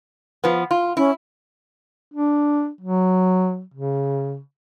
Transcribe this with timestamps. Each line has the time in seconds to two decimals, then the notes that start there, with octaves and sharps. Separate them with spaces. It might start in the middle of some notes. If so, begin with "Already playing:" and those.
0.44 F3 B3
0.71 F4
0.97 C#4 E4
2.13 D4
2.81 F#3
3.74 C#3